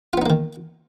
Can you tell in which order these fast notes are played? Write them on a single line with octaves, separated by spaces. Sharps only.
F4 B3 D#4 A#3 D#3